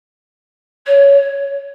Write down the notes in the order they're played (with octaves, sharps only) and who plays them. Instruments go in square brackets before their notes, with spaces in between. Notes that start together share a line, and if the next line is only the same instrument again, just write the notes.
[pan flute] C#5